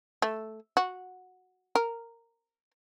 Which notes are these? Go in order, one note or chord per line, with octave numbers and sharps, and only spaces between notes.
A3
F#4
A#4